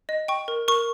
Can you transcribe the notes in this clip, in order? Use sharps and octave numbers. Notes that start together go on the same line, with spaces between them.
D#5
G5 C#6
A#4
A#4 C#6